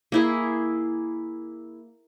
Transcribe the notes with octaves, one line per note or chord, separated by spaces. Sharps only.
A#3 E4 G#4